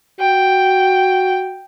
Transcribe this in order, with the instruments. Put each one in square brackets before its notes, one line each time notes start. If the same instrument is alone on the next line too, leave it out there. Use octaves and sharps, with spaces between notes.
[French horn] F#4 [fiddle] G5